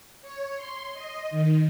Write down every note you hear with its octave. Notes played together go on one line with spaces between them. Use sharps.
C#5
C6
D#5
D#3